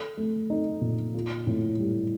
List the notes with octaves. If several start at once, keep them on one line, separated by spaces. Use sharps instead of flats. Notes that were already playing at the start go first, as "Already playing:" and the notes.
Already playing: A4
A3
D#4
A#2
F4
A2
G3